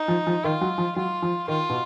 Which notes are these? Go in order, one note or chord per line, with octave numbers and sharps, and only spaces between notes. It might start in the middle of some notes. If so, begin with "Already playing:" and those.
Already playing: D#4
F3
F3
D#3 F4
F#3
F3
F#3 F4
F3
D#3 F4
B2